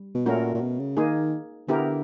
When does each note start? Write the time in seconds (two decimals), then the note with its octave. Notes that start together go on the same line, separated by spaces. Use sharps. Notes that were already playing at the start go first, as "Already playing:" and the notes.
Already playing: G3
0.15 B2
0.26 A#2 A3 C#4 F#4 A#4
0.54 A#2
0.62 B2
0.80 C#3
0.97 D#3 A#3 D#4 G#4
1.68 D3 B3 E4 G4 A#4